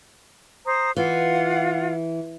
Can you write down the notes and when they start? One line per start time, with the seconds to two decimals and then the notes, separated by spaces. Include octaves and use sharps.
0.66 C5 A#5 D#6
0.97 E3 F4 F5 F#5